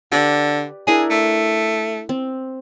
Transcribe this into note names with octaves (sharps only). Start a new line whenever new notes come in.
D3 G4 B4 D5
D4 E4 G#4 A#4
A3
C4